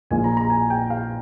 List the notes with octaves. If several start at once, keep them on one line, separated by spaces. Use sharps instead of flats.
A#1 A#2 F3 G#5
A#5
A#5
G#5
G5
F5